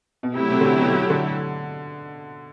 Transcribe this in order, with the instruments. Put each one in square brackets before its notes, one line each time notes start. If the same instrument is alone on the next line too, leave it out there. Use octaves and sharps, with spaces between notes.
[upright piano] B2
[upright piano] C3 [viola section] F#3 A3 E4 G4
[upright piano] C3
D3
C3
B2
D3